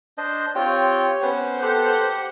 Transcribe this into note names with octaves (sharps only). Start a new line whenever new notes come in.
D4 C5 D#5
C4 F4 G4 C#5 G5
B3 C#4 B4 C5
G4 A4 C5 F#5